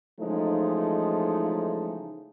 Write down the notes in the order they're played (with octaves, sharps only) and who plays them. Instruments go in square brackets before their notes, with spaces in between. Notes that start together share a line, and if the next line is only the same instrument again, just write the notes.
[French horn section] C#3 E3 F3 G#3 A3 D#4